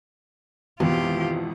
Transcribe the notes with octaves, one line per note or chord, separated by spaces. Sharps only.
G#1 F2 B2 E3 F4 G4